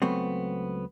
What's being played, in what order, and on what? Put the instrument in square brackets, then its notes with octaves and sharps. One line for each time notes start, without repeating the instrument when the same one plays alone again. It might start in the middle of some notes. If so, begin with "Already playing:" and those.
[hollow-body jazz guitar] C#2 F#3 A3 B3 C4